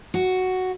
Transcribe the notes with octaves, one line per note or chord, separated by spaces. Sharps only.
F#4